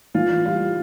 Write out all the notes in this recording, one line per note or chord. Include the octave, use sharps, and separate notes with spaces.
E3 F4
G3 F4